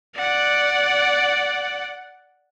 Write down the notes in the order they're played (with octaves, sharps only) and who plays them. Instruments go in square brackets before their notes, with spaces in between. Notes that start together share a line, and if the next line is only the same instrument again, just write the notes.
[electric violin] D5 F#5